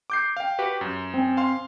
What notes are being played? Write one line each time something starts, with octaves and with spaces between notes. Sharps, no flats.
D6 G6 C7
F5 G5
F#4 G4 B4
F#2
C4 G#5
F5 C6